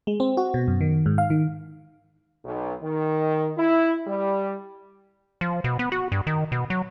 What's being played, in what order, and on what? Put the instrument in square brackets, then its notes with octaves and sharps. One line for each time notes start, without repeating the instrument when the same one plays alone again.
[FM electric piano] G#3
C4
F#4
B2
F#2
D#3
G#2
F5
D#3
[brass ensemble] B1
D#3
E4
G3
[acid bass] F3
B2
B3
F#4
G2
D#3
B2
F#3